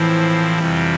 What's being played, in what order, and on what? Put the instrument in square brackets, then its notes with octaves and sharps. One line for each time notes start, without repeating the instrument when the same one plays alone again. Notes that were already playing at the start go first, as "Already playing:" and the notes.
Already playing: [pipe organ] A2 F3 C4 E4 [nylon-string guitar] E3
[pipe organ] F2 C3 G3